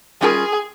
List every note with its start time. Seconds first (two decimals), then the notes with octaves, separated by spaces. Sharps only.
0.21 G3 C#4 F4 G#4 A#4